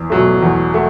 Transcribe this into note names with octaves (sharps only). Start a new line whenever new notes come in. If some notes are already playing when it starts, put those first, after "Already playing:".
Already playing: E2
B2 F#3 A3
E2
A3